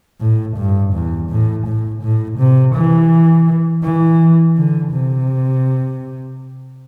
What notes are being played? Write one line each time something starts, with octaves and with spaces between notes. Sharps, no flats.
A2
G2
E2
A2
A2
A2
C3
E3
E3
D3
C3